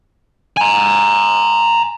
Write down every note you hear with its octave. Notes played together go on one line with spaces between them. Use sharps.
G#5 A#5